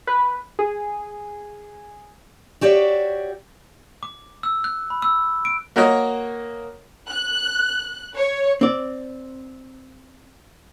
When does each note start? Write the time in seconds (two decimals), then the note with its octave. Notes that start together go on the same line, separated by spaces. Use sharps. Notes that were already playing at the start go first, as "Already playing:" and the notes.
0.07 B4
0.59 G#4
2.61 F#4 G4 C#5 D5 E5
4.03 D6
4.43 E6
4.64 F#6
4.90 B5
5.02 E6
5.45 D7
5.76 A#3 F#4 A#4 C#5 D#5
7.08 F#6
8.15 C#5
8.61 C4 D5